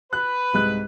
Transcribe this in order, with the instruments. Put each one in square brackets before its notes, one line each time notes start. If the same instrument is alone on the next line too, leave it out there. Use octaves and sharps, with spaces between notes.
[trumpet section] B4 [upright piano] F#6
[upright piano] C2 G#2 F#6